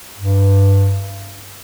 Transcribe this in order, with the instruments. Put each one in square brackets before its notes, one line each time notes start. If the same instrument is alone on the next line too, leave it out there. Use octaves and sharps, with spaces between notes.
[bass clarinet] G2